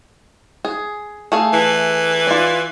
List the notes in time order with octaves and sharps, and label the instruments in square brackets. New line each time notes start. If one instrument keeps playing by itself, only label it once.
[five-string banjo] G#4
A3 G#4 F5
[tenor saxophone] E3
[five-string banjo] F4 D5